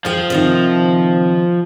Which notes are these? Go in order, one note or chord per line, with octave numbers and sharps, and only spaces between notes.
F3 G#4 G5
C3 D#3 D#4